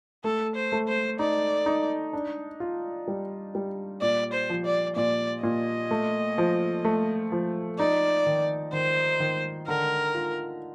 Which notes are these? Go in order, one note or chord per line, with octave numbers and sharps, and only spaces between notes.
A3 A4
C5
A3
C5
D#4 D5
D#4
D4
F4
G3
G3
A#2 D5
C5
F3
D5
A#2 D5
A#2 D#5
A3
F3
A3
F3
D#4 D5
D#3
D#3 C5
D#3
D3 A#4
F4